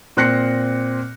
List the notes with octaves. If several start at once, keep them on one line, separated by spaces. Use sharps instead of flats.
A#2 C4 F#6 A#6 C7 C#7